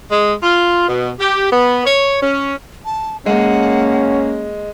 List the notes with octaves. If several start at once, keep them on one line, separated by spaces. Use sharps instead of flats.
G#3
F4
B2
G4
B3
C#5
C#4
A5
G#3 A#3 C#4 F#5